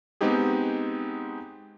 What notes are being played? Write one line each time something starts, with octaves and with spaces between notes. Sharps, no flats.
G#3 B3 C4 D#4 G4 G#4